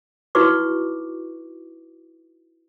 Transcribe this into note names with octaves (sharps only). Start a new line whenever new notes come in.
D#4 E4 F#4 B4 C#6 D6